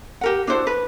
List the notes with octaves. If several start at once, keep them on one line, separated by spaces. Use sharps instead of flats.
G4 A#4 F#5
D4 E4 F#4 C5
B4